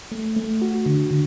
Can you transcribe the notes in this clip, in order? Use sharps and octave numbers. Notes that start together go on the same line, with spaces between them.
A3
A3
F#4
D3
D3